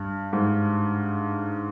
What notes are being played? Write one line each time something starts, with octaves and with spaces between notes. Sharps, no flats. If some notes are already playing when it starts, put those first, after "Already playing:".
Already playing: G2
G#2